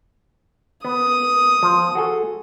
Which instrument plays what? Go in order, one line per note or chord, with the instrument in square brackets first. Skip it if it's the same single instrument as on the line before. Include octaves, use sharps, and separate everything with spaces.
[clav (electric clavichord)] B3 [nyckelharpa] D#6
[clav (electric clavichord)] F3
F#4 G#4 A4